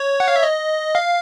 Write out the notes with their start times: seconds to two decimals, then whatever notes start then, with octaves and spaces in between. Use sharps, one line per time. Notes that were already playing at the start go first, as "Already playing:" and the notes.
Already playing: C#5
0.20 F#5
0.28 F5
0.36 E5
0.43 D#5
0.95 F5